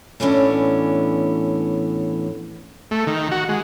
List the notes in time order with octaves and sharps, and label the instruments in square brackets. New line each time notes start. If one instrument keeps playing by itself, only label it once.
[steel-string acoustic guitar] A2 E3 B3 C#4 D4
[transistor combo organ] A3
D#3
F#4
G#3